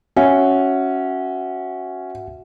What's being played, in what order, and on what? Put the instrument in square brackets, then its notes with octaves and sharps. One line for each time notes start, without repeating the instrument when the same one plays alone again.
[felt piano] C#4 [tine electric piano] F#4 E5 F#5